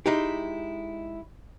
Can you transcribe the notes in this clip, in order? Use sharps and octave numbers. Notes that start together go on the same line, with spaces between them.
G#3 D#4 E4 G4